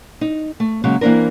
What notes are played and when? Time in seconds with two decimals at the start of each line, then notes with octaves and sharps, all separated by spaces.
0.21 D#4
0.60 A3
0.84 C#3 F#3 G#3 A#3
1.01 E3 A#3 C4 D4 A#4